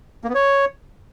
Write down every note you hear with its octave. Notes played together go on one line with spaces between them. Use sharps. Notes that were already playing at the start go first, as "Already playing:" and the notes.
A#3
B3
C#5